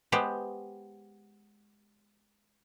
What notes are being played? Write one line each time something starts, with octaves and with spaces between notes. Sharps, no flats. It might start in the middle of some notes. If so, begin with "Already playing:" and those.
G#3 B3 G4 C5